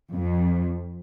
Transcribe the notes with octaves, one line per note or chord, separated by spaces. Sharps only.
F2